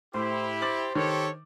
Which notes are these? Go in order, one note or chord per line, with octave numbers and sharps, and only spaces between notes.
A2 E4 G4 C5
C5 D6 A6 F#7
D#3 G4 A4 C#5